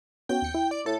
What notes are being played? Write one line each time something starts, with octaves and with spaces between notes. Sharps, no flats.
B3 C#4 F#4 G5
D#2 C#7
E4
D5
A2 A4